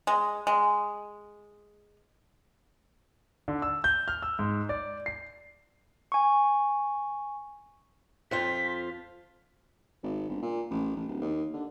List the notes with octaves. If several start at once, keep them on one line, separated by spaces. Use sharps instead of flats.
G#3
G#3
D3
E6
G6
F6
E6
G#2
D5
C7
G#5 C#6
F2 F3 F4 B6
G#1
G1
A#2
A1
A1
D1
D#2
D3